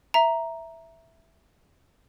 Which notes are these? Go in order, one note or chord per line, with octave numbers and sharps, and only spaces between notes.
E5 A#5